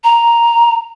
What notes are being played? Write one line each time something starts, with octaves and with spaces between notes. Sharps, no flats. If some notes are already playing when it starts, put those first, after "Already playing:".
A#5